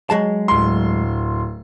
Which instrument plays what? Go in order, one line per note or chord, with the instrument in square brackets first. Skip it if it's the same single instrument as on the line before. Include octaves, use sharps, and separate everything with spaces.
[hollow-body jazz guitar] F#3 G#3 A5
[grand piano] D1 C6